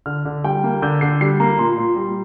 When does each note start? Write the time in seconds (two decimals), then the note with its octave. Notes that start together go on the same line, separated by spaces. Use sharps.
0.06 D3 F6
0.25 D3
0.44 G3 G5
0.64 A#3
0.82 D3 G6
1.01 D3 C7
1.21 G3 C7
1.40 A#3 A#5
1.58 A#2 C6
1.78 A#2
1.96 G3